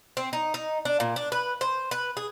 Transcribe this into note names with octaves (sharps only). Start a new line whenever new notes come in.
C4
D#4
D#4
D4
A#2
D4
B4
C5
B4
G#4